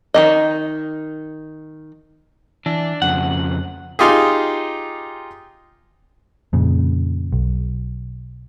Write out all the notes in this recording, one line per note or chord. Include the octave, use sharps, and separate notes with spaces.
D#3 F3 D#5
E3 D4
F2 C#3 F#5
D#4 F4 G4 G#4
F2 A#2 C#3
B1